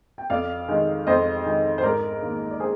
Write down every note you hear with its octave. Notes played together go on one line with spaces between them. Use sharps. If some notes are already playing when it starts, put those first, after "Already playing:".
G5
F2 D5 F5
D#3 G#3
F2 C5 D#5
D#3 G#3
C5
G#2 A#4 D5
D#3 A#3
D5
G#4 C5